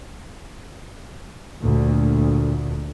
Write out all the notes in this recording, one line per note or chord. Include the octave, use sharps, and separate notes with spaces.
D2 A#2